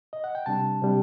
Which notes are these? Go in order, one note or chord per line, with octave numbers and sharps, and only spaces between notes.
D#5
F#5
G5
C3 G3 D4 A5
C3 G3 D4